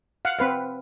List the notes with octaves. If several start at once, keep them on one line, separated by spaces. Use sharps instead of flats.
F5 F#5
C4 B4 F5